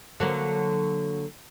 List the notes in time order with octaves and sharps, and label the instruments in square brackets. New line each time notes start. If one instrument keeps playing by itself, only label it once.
[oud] D3 F#3 A#3